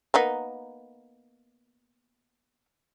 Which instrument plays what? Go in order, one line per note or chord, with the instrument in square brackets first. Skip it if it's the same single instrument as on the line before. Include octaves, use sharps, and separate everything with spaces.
[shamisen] A#3 B3 D#4